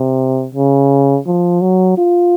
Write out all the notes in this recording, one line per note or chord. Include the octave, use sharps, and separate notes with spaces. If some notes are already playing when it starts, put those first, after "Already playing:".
Already playing: C3
C#3
F3
F#3
F4